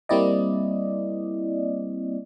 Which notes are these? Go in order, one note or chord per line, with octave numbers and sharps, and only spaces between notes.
G3 A#3 C4 E4 D5 D#5